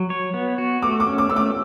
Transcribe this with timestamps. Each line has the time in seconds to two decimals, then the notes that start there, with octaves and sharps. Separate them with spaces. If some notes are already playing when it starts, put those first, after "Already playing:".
Already playing: F#3
0.10 C#5
0.34 B3
0.58 F#4
0.82 A3 D6
1.00 D6
1.07 C#4
1.18 D6
1.30 A3 E6
1.36 D6